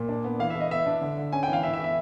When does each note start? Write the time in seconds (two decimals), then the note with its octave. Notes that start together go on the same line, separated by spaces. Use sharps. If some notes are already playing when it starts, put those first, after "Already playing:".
Already playing: A#2
0.09 D4
0.24 B3
0.39 E3 F5
0.50 E5
0.55 E3
0.60 D#5
0.71 B3 E5
0.86 D4
1.01 D3
1.17 D3
1.32 C#4 G#5
1.43 G5
1.48 E3 F5
1.63 E3 E5
1.73 E5
1.79 E3
1.84 E5